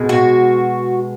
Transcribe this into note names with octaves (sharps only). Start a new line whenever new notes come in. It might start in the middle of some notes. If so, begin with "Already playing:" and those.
Already playing: B2 G#3
F#4